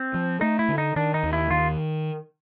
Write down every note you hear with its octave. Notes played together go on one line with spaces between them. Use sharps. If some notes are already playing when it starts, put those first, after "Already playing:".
Already playing: C4
F3
A3 D#4
E4
D3
D#4
D#3 D4
D#4
D#2
E4
D#3 F4